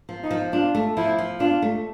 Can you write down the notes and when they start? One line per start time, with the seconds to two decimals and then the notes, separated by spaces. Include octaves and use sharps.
0.09 F3
0.23 D#4
0.31 F3
0.52 D4 F4
0.75 A3
0.97 F3 E4
1.19 F3
1.40 D4 F4
1.62 A3